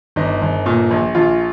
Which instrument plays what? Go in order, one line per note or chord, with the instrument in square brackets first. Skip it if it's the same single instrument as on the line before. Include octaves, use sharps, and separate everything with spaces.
[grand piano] G1 D#4
G1
A#2
A#1
A#1 F4